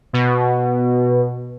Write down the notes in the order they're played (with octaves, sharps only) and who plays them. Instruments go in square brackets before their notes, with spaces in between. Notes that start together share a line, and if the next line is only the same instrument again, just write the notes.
[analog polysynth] B2